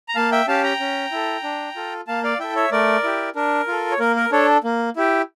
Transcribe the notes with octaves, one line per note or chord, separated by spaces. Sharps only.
A#5
A#3 F5 A5
E5 G5
C#4 G4 F5 A5
G5 A#5
C#4
E4 A4
D4
F4 A4
A#3 F5 A5
D5 F5
E4 A4 E5 G5
C#5 E5
A3 A#4 D5
E4 G4
D4 A#4
F4 A4
C#5
A#3 A#4
A#4
D4 A4 C#5
A#3
E4 G4